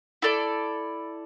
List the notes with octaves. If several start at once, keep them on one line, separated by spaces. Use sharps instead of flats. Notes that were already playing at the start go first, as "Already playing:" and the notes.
E4 A4 D5